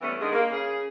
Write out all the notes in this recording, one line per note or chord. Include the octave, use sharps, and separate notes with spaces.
E3 G3 A3 B3 C#4
D3 D#3 G#3 G#4
A#3
C#3 G#4